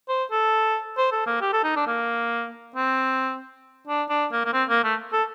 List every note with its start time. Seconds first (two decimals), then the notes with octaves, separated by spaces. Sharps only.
0.09 C5
0.31 A4
0.98 C5
1.12 A4
1.27 A#3
1.41 G4
1.53 A4
1.64 D#4
1.76 D4
1.87 A#3
2.76 C4
3.88 D4
4.09 D4
4.32 A#3
4.45 A#3
4.53 C4
4.69 A#3
4.84 A3
5.13 A4